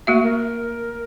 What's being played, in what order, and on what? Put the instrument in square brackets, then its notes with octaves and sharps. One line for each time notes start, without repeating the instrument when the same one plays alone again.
[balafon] A3 A#3 E5 [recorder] F#4
[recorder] A#4